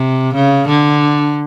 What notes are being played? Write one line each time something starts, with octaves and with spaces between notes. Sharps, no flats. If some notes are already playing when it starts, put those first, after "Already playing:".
Already playing: C3
C#3
D3